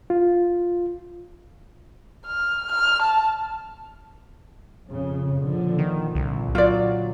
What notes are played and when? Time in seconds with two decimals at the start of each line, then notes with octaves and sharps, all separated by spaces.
0.10 F4
2.26 F6
2.71 F6
3.02 A5
4.88 F2 C#3
5.39 A#2 D3 F3
5.78 D#3
6.15 C2 A#2 D3
6.55 F#3 F4 D5